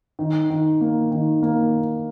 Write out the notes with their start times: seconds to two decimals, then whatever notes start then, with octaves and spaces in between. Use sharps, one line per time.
0.19 D#3
0.50 D#3
0.81 A#3
1.11 D#3
1.42 A#3